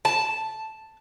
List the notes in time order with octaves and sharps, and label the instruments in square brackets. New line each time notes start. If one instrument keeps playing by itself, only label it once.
[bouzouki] A5